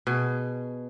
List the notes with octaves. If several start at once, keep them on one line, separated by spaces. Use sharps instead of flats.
B2 G#4